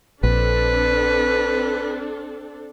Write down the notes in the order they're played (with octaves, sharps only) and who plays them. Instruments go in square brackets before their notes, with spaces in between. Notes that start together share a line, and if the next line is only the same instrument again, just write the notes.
[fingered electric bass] A#1 [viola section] C4 D4 A4 [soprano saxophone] B4